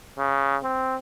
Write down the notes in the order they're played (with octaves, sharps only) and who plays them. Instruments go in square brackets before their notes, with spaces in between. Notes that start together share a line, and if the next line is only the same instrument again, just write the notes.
[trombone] C#3
C4